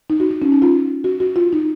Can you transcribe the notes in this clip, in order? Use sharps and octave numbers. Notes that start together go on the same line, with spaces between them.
D#4
F#4
D#4
C#4
D#4
F4
F#4
F#4
F4
D#4